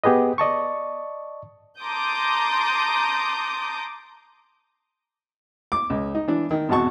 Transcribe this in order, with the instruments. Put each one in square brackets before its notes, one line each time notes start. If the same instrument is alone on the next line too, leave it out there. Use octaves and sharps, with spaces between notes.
[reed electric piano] B3 G4 G#4 B4 D#5
D5 D#5 A5 C#6
[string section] A5 A#5 C6 D6 D#6 G6
[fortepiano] D6
C#2
D#4
E3 D4
D#3
G#1 E2 B2 F#4 A5 C#6